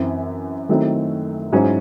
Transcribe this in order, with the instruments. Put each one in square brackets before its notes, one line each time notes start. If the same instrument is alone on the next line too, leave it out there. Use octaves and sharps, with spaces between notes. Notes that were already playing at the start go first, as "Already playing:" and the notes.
Already playing: [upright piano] F#2 E3 C4 E4
D#3 F#3 A3 C4 E4
G#2 F#3 C#4 E4 C5